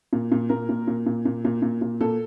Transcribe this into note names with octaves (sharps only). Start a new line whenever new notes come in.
A#2
A#2
A#2 A#4
A#2
A#2
A#2
A#2
A#2
A#2
A#2
A#2 A4